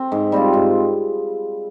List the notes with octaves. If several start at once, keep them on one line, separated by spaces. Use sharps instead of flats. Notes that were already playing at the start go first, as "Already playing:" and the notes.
Already playing: C4
G#2
G3 C4 F4
G#2